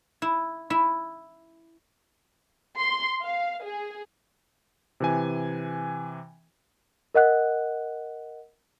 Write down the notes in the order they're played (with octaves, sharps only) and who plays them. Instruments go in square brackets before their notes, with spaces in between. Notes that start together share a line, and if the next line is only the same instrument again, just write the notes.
[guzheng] E4
E4
[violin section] C6
F5
G#4
[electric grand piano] C3 E3 G#5
[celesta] A#4 D#5 F#5 F#6